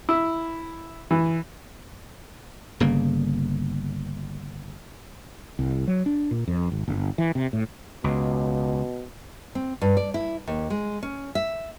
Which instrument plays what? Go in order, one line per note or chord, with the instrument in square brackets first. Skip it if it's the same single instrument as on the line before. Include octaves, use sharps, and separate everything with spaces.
[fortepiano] E4
E3
[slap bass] G1 C#3 A#3
[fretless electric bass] C2
F#3
D4
A#2
F2
G#1
G1
E3
C3
A2
[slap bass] C#2 [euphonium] B2
[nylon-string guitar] C4
G2
D5
E4
D#2
G#3
C#4
E5